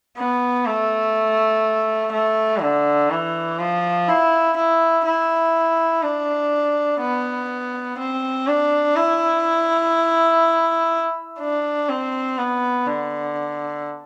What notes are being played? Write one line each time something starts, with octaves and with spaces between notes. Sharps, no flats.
B3
A3
A3
D3
E3
F3
E4
E4
E4
D4
B3
C4
D4
E4
D4
C4
B3
D3